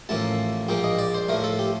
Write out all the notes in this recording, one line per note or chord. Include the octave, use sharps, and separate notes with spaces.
A1 A2 F3 A#3 A5
A#1 A#2 F3 A#3 G5
D#5
D5
C5
A2 F3 A3 A#4
A4
G4